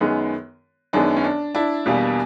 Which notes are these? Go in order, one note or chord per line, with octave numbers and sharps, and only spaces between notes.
F#2 D#3 G#3 B3
F#2 D#3 G#3 B3 D4
C#4
D4
D4 E4
E2 B2 G3 A#3